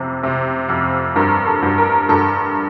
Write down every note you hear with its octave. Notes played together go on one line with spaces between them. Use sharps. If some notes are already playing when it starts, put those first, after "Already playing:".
Already playing: F2 C3
C3
F2
G2 A#4
A4
G2
A#4
G2 A4